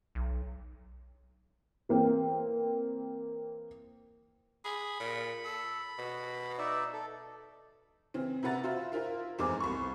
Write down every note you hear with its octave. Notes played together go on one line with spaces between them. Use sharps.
B1
E3 A#3 C4
G#4 B5
A#2
A4
B2
D#4 D5 E5
A4
C#3 E3 C4
C3 E4 B4 F#5 A#5 A6
F4 F#4 C5 E5
E4 F4 A#4 C5
F1 E2 G#2 G#4 C5 D6
C2 B5 C#6